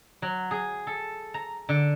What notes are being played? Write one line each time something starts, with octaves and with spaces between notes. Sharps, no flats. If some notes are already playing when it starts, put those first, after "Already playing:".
F#3
G#4
A4
A#5
D3